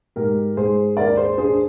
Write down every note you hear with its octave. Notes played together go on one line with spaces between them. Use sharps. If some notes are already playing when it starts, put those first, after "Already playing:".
G#2 G4 A#4
G#2 G#4 C5
D#2 A#4 D5
G#4 C5
D4 G#4 C5